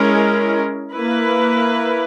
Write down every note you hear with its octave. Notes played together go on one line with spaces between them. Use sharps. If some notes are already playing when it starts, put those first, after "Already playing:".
Already playing: G#3 C#4 E4 A#4
A#3 E4 B4